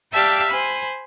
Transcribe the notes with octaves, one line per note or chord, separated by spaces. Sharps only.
G4 D5 E5 F5 G5 A5
C5 G#5 B5